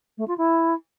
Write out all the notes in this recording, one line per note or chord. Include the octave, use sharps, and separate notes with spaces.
A3
F4
E4